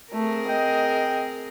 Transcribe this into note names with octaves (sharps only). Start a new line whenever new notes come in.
A3 C4 G#4 A#4
D#5 G5